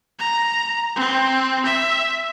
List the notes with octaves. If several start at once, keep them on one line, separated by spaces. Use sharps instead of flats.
A#5
C4
E5